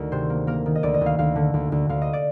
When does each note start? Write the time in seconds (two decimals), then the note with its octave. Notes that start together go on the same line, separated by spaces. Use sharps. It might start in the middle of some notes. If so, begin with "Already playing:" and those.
Already playing: D2 D#3 A#4
0.12 C3 C5
0.30 A#3
0.47 A#3 A#4
0.66 D#3
0.75 D#5
0.83 D2 D5
0.94 D#5
1.01 D2
1.06 F5
1.19 D2 F5
1.36 D3
1.54 D2
1.72 D2
1.89 D2 F5
2.02 D#5
2.13 D5